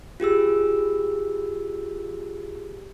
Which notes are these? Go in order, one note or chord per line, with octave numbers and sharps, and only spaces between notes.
F4 G4 G#4 E6